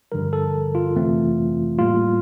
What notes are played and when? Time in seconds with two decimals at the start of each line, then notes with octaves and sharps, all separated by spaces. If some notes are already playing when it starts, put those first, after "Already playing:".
0.12 G2 D3 F3 A#4
0.33 A4
0.75 F4
0.95 F2 C3 E3 A3 C4
1.79 A2 G3 A#3 F4